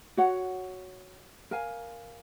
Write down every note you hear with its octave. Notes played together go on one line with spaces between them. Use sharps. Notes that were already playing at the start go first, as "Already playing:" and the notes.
F#4 C#5 F#5
A#4 F5 G#5